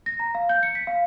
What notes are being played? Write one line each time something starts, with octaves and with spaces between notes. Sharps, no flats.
A#6
A#5
F5
G6
C#7
B6
F5